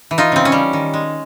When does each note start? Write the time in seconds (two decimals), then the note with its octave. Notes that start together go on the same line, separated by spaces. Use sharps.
0.11 E3
0.18 D#4 F4
0.32 C#3 C4
0.45 C#4
0.52 G3
0.73 D#3
0.94 G#3